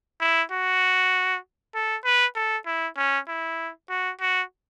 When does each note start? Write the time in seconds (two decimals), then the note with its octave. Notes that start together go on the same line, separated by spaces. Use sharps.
0.21 E4
0.51 F#4
1.75 A4
2.05 B4
2.36 A4
2.66 E4
2.97 C#4
3.28 E4
3.89 F#4
4.21 F#4